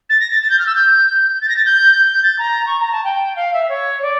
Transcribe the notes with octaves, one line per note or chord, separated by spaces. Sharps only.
A6
A#6
A6
A6
G6
F6
E6
G6
A6
A#6
A6
G6
G6
A6
A#5
C#6
A#5
A5
G5
F5
E5
C#5
D5